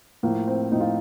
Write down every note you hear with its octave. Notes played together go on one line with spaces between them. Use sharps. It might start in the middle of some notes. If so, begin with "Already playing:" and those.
A2 F3 A#3
C4
A2 F3 D#4
F4